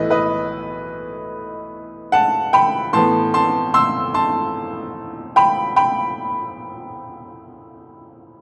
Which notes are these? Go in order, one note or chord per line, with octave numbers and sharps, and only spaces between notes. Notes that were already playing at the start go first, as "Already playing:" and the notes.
Already playing: B1 A2 E3 A3 E4 B4 D#5
B4 D#5
F#5 A5
G5 B5
A2 E3 B3 A5 C6
A5 C6
C6 E6
A5 C6
G5 B5
G5 B5